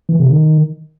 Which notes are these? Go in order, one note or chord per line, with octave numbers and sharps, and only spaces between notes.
E3
C3
D#3